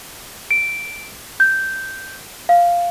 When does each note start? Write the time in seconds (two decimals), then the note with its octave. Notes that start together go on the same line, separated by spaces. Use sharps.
0.51 D7
1.40 G6
2.49 F5